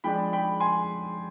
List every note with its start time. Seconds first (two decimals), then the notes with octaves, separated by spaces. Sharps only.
0.04 F3 G#3 D4 G5 B5
0.33 G5 B5
0.60 G#5 C6